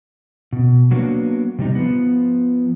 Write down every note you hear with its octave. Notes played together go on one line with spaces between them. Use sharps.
B2
F#3 A#3 B3 D4 F#4
C3 G3 D#4
F3 B3